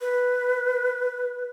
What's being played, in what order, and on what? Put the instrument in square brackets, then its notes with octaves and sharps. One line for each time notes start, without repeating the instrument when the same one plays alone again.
[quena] B4